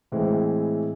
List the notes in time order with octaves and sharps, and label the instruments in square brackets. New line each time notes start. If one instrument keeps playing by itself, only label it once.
[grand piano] A2 E3 G#3 C4